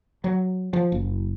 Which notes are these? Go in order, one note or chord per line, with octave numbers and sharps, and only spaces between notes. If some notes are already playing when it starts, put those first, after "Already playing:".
F#3
F3
F#1